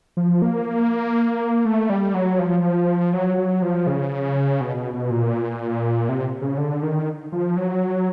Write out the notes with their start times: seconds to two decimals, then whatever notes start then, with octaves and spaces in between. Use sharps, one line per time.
0.17 F3
0.42 A#3
1.65 A3
1.90 G3
2.14 F#3
2.39 F3
3.14 F#3
3.37 F#3
3.62 F3
3.87 C#3
4.61 B2
4.77 B2
4.94 B2
5.10 A#2
6.09 C3
6.42 C#3
6.58 D3
6.83 D#3
7.32 F3
7.57 F#3